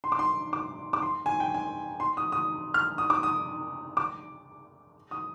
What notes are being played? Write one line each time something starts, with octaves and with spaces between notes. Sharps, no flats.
C6
D6
C6
D6
D6
C6
G#5
G5
G#5
C6
D#6
D#6
F6
D#6
D6
D#6
D6
D#6